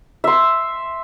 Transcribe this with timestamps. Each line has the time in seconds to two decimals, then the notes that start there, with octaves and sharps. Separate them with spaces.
0.24 E5 C6